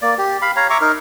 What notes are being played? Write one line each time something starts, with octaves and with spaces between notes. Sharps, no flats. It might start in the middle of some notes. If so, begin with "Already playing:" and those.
A#3 D5
G4
F5 B5
C#5 F5 A#5
E5 A#5 C#6 D6
D#4 A#4